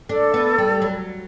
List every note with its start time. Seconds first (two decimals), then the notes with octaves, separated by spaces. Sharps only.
0.09 D4 A4
0.34 B3
0.58 G3
0.82 F#3